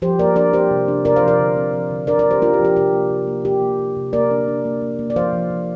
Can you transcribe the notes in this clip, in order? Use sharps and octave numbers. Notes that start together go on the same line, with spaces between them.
F3 G4 C5
A#3 A#4 D5
D4 A#4 D5
F3 G4 C5
C3
D4
C3 A#4 D5
C5 F5
F3
A#4 D5
D3
C4
F3
D3
D4 A#4 D5
A#4 D5
F3
G4 C5
D4 F4 A#4
G4
F3
G4
C3 G4
A#3
C3
A#3
A#3 G4
A#3
C3
C3
A#3 A#4 D5
D4
D4
A#3
A#3
A#3
D5
F3 C5 F5
F3
F3